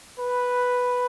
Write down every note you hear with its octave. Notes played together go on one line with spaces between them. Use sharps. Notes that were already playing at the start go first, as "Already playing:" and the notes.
B4